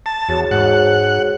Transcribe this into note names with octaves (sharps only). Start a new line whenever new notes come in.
A5
E2 F#4 G#4 C#5
G#2 F#5